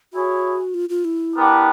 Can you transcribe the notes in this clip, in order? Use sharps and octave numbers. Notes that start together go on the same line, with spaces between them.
E4 F#4 G#4 C#5
F4
F4
E4
B3 D4 G4 A#4